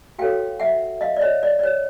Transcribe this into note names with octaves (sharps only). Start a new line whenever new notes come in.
F#4 A4 C#5 F5 G5
E5 F#5
D#5 F5
D5
C#5 D#5
D5
D5
C#5